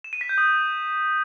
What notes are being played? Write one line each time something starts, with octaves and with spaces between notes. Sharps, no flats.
E7
D#7
B6
G6
D#6